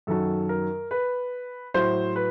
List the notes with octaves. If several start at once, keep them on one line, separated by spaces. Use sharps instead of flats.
F#2 D#3 F#3 A4
A#4
B4
A2 F#3 C5
B4